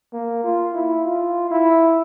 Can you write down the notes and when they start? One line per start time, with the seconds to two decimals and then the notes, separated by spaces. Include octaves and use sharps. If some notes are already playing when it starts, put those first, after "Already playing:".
0.13 A#3
0.44 F4
0.74 E4
1.05 F4
1.51 E4